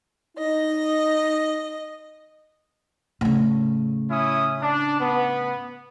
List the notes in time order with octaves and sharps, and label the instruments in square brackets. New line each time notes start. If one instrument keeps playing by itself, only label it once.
[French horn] D#4 [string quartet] D#5
[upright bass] A2 C#3
[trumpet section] C#4 E4 D#6
D4
B3